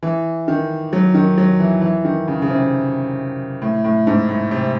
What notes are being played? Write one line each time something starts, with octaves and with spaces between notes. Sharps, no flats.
E3
D#3
F#3
D#3
F#3
E3
E3
D#3
C#3
C#3
C3
A2
A2
G#2
A2
C3